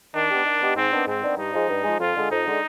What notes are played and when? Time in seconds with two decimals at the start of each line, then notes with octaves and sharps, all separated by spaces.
0.14 D#3 D4
0.30 B3 D#4 G4
0.45 D#3
0.61 B3 D#4 G4
0.76 G#2 C4
0.92 D#3 B3 D4
1.07 G#2 C4
1.23 D#3 B3 D4
1.38 G2 D#4
1.53 F3 G#3
1.70 G2
1.84 F3 G#3
2.00 F2 F4
2.15 D3 G#3
2.31 F2 D#4
2.47 D3 G#3